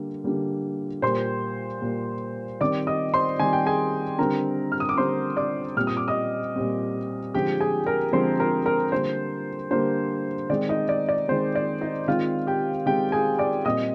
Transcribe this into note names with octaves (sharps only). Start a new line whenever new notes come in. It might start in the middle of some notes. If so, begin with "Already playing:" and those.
Already playing: D3 G3 A#3
D3 G3 A#3
A#2 G3 A#3 C5 C6
A#2 G3 A#3
D#3 G3 C4 D5 D6
D#5 D#6
C5 C6
D#3 G3 C4 G#5
G5
G#4 G#5
D3 G3 C4 A#4 A#5
F6
D#6
D6
D3 G3 C4 C5 C6
D5 D6
A#2 G3 C4 F6
D#6
D6
D#5 D#6
A#2 G3 C4
D3 F3 G#3 C4 G4 G5
G#4 G#5
A#4 A#5
D3 F3 G#3 C4 C5 C6
A#4 A#5
A#4 A#5
D3 G3 A#3 C5
D3 G3 A#3 C5
D#3 G#3 C4 D5
D#4 D#5
D5
D5
D#3 G#3 C4 C5
D5
D#4 D#5
D#3 G#3 C4 F4 F5
G4 G5
D#3 G#3 C4 G4 G5
G#4 G#5
D5 D6
A#2 G3 C4 D#5 D#6